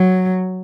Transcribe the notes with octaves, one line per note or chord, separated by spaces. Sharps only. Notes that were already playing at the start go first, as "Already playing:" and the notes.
Already playing: F#3